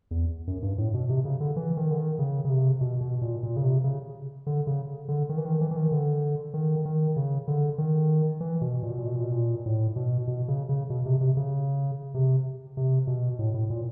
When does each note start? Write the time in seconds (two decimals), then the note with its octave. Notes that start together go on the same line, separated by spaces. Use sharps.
0.11 E2
0.47 F#2
0.62 G2
0.78 A2
0.94 B2
1.09 C3
1.25 C#3
1.40 D3
1.56 E3
1.77 D#3
1.91 D3
1.97 D#3
2.19 C#3
2.45 C#3
2.50 C3
2.81 B2
3.01 B2
3.21 A#2
3.43 A#2
3.56 C#3
3.63 C3
3.84 C#3
4.47 D3
4.67 C#3
5.08 D3
5.29 D#3
5.38 E3
5.46 D#3
5.61 E3
5.71 E3
5.77 D#3
5.92 D3
6.54 D#3
6.85 D#3
7.16 C#3
7.48 D3
7.78 D#3
8.40 E3
8.61 B2
8.83 A#2
8.91 B2
8.99 A#2
9.07 B2
9.15 A#2
9.23 B2
9.32 A#2
9.66 A2
9.96 B2
10.27 B2
10.48 C#3
10.69 C#3
10.90 B2
11.06 C3
11.21 C3
11.37 C#3
12.14 C3
12.77 C3
13.07 B2
13.39 A2
13.54 A2
13.70 A#2